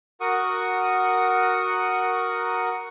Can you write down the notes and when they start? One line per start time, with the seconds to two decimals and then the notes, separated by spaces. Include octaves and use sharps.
0.21 F#4 A#4 F#5 C#6 D#6